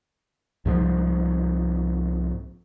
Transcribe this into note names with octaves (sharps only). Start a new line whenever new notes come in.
C2 G#2 F3 G#3